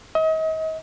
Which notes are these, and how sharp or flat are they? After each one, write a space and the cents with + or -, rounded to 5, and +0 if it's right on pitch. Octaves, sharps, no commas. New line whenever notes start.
D#5 +35